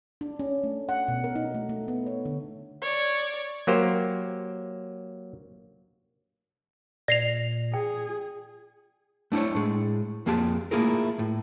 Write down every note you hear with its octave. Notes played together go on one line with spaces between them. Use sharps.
D4
C#4
A3
F#5
B2
A#4
D#4
A3
A3
B3
C#5
D3
C#5 D5
F#3 A#3 G4 C5
A#2 D5 A#6 C7 F7
G#4 G5
A3 D4 E4 C5 C#5
A2 G#3
F2 A#3 G4 G#4 A5
A3 A#3 E4 F4 G#4 A#4
A2